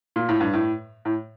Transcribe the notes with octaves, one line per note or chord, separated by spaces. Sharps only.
A#2
A2
G2
A2
A2